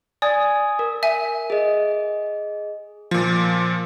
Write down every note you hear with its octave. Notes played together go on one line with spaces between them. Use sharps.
D5 G#5 D#6 G#6
A#4
E5 G#5
G#4 D#5
A#2 F3